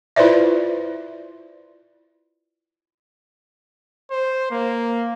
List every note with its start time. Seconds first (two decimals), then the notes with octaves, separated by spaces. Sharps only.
0.16 E4 F4 B4 C5 D5 E5
4.11 C5
4.51 A#3